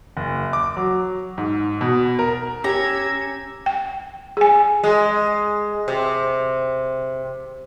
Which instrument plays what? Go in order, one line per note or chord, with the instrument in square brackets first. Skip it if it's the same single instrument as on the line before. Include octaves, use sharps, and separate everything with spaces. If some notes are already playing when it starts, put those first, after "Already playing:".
[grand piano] F#1
D6
F#3
G#2
B2
A#4
[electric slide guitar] C#4 [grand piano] G4 [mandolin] A#5 [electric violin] E6 G#6
[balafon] G5
G#4 G#5
[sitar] G#3
C3